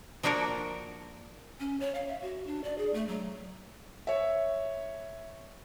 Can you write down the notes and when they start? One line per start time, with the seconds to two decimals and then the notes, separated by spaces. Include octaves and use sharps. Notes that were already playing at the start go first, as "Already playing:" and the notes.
0.23 F3 A#3 D4 F#4 A#4
1.60 C#4
1.80 C#5
1.95 F5
2.07 E5
2.22 F#4
2.47 D4
2.64 D5
2.78 G#4
2.94 A3
3.08 F#3
4.07 C#5 E5